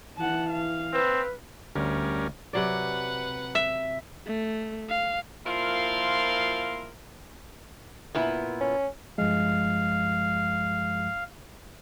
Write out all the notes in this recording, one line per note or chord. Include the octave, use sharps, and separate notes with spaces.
E3 F#5 A5
F5
C4 B4
D2 G3 C#4 A#4
C3 F#3 B4 D5 F#5
E5
A3
F5
A#2 F3 E4 A#4 F5 C6
A#2 B3 E4
C#4
G2 F3 G#3 F5